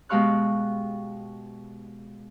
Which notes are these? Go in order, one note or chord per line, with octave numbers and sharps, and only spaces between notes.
B2 G#3 G4 F5 C#6 F#6